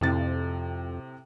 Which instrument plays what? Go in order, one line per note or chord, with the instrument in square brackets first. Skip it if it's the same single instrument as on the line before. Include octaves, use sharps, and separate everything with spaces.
[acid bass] F2 [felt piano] A2 C3 A6